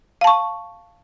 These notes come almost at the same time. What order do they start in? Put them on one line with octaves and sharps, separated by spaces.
F5 A5 C#6